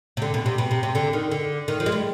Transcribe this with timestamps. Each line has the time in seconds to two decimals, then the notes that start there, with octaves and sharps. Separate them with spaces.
0.17 C3
0.22 D3
0.34 B2
0.46 C3
0.58 B2
0.71 C3
0.83 C3
0.95 D3
1.13 D#3
1.32 D3
1.68 D#3
1.80 F3
1.86 G#3
1.92 G3